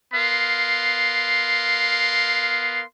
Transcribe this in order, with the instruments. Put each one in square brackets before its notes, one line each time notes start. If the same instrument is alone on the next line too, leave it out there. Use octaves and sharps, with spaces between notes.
[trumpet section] B3 A#4 F5 C6